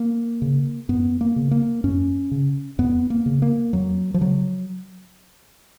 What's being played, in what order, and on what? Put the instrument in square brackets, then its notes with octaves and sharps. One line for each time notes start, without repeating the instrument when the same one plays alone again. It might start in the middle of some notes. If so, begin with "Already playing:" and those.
Already playing: [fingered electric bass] A#3
C#3
F#2 B3
A#3
C#3
A#3
F#2 C#4
C#3
F2 B3
A#3
C#3
A#3
F2 F#3
F3
C#3 F#3